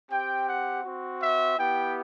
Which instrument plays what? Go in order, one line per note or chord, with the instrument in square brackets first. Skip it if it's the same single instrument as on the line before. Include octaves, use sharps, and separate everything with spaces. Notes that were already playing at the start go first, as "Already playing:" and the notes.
[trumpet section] C4 G4 G5
F#5
C4 F#4
E5
B3 E4 G4 G5